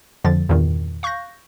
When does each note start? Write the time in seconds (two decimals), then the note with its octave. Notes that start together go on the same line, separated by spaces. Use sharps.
0.24 F2 D3 F3 A6
0.49 E2 G2 A#2 D#3
1.03 F5 C#6 F#6 G6 A#6